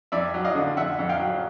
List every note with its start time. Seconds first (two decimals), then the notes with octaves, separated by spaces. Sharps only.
0.12 F2 D5 E5
0.34 F#3
0.44 D#5 F5
0.55 D3
0.77 F2 E5 F#5
0.99 F2
1.09 F5 G5
1.20 F#3